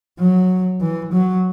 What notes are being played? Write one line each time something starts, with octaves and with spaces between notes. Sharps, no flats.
F#3
E3
F#3